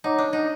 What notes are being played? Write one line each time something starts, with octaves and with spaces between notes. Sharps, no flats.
D#4 C#5 F#5 A#5 D6
D4
D#4